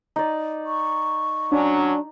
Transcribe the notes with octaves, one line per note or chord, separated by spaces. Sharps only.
D#4 D5
C#6
F#3 C#4 D4